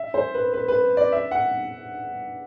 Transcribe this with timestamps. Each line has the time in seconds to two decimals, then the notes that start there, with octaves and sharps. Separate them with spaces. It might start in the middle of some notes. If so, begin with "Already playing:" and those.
Already playing: E5
0.14 C5
0.34 B4
0.53 B4
0.68 B4
0.97 D5
1.12 E5
1.31 F#5